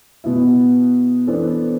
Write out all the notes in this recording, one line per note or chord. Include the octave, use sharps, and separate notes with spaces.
B2 B3 E4
E3 B3 D4 A4 C5